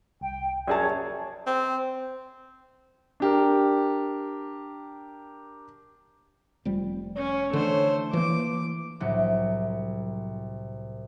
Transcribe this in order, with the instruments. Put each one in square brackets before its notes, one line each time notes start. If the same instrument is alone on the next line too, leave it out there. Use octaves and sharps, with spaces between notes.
[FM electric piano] C2 [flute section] G5
[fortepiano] F#2 G#4 A5 [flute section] C#5 [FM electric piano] D5
[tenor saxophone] C4
[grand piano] D4 G4 A#4
[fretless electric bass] F1 F2 G3
[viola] C#4 [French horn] C#5
[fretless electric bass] D3 E3 [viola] A3 C5
[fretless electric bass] E3 A#3 [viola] D6
[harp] C2 A2 F#3